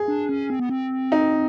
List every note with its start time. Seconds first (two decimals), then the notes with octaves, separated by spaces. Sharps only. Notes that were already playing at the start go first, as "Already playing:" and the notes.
Already playing: G#4
0.08 D4
0.29 C#4
0.50 C4
0.60 B3
0.69 C4
1.12 D#4